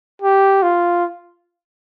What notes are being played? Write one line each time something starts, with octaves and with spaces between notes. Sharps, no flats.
G4
F4